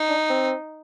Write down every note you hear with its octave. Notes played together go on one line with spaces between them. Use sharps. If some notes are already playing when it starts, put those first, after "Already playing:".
Already playing: D#4
D4
C4